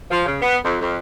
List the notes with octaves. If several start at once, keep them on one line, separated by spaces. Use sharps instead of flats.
F3
C#3
B3
F2
F2